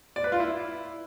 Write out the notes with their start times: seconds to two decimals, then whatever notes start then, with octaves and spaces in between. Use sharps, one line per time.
0.16 D5
0.24 B4
0.32 F4
0.40 E4